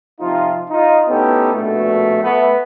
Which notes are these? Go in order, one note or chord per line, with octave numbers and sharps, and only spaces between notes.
C3 F3 D#4 F4
D#4 F4
A2 B3 C#4 D#4 G4 A4
A#1 B2 A3
A3 B3